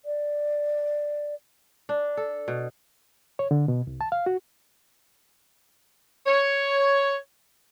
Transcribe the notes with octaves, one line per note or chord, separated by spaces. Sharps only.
D5
D4
A4
B2
C#5
D3
B2
C2
A5
F5
F#4
C#5